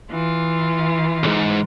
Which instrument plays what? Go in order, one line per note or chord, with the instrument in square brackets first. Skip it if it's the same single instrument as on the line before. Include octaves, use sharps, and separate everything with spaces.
[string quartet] E3 F4
[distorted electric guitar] B1 G#2